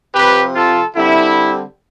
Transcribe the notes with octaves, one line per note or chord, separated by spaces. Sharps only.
C3 F3 C4 G4 B4
F4 A4
D3 G3 C4 E4